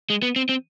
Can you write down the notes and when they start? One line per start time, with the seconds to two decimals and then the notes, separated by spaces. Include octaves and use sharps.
0.10 G#3
0.22 B3
0.36 C4
0.49 C4